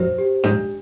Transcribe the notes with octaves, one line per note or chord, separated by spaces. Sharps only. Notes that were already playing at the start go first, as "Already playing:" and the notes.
Already playing: F#2 C5
G4
G#2 D4